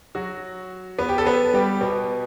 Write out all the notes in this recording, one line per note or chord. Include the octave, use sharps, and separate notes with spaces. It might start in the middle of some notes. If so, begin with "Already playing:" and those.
F#3 F#4
B3 B4
G4
A4
B3 B4
G3 G4
B2 B3